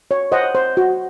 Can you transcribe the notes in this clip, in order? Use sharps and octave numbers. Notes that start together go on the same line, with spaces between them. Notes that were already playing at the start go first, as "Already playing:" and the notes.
C#5
C5 D#5 F#5
C5
F#4